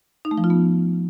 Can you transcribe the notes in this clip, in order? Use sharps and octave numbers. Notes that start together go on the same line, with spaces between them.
D#4
A3
F3
F4
B3